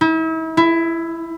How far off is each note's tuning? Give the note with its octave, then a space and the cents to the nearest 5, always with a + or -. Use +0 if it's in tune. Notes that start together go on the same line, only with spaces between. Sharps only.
E4 -40
E4 +15